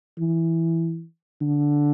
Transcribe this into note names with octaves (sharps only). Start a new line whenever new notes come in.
E3
D3